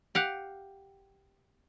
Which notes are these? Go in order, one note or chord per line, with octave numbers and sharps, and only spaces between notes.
G4 F5 F#5